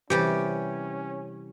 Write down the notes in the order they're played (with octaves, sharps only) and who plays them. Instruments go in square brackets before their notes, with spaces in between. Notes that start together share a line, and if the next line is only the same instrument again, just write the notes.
[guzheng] C3 E3 G3 [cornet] C#4 [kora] G4